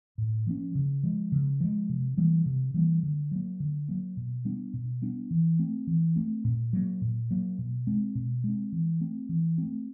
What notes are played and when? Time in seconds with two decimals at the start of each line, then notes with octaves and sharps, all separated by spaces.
0.18 A2
0.47 F3 A#3 C#4
0.75 C#3
1.03 F3 G#3
1.32 C#3
1.60 F3 G#3
1.89 C3
2.17 E3 G3 A#3
2.46 C3
2.74 E3 G3 A#3
3.03 D3
3.31 F#3 A#3
3.60 D3
3.89 F#3 A#3
4.17 B2
4.45 G3 B3 D4
4.74 B2
5.02 G3 B3 D4
5.31 E3
5.59 A3 C4
5.87 E3
6.16 A3 C4
6.45 A#2
6.73 F#3 A#3
7.01 A#2
7.31 F#3 A#3
7.59 B2
7.87 G#3 C4
8.15 B2
8.44 G#3 C4
8.72 E3
9.01 A3 C4
9.29 E3
9.58 A3 C4